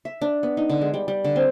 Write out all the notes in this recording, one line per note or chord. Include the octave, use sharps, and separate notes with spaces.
E5
D4
B3
D#4
D3
G#3
G3
G3
D3
C4